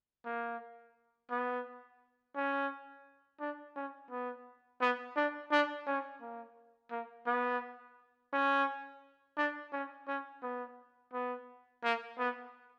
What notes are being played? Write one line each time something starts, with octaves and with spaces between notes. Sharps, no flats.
A#3
B3
C#4
D4
C#4
B3
B3
D4
D4
C#4
A#3
A#3
B3
C#4
D4
C#4
C#4
B3
B3
A#3
B3